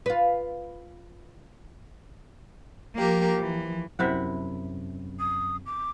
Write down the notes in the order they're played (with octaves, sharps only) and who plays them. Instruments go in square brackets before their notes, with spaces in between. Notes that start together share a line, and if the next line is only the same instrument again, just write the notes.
[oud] F4 B4
[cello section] F3 [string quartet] A#3 G4 A#4
[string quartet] E3
[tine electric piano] F#2 [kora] C3 E4 F#5
[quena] D#6
D6